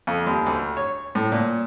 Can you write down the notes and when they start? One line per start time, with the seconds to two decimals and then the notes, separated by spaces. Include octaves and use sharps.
0.07 F2
0.26 D#2
0.46 D2
0.77 C#5
1.15 A2
1.32 A#2